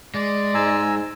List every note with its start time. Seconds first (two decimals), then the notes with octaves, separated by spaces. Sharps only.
0.14 G#3 D5
0.55 G#2 G#5 A#5 E6